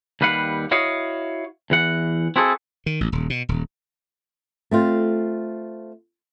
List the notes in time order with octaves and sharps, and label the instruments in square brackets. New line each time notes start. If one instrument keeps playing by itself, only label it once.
[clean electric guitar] D#2 G3 B4 F5 F#5
E4 F#4 C#5 D#5 F5
E2 E3 F#5
C4 E4 F#4 G#4 A4
[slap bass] D#3
A1
D#1
B2
D#1
[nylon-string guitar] A3 C4 F4